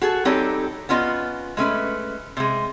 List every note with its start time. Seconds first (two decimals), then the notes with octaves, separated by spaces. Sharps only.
0.01 F#4 G#4 A4
0.25 G3 C4 D#4 G4 A4 C#5
0.89 B3 C#4 F4 D#5
1.57 G#3 A3 C#4 B4
2.37 C3 G#3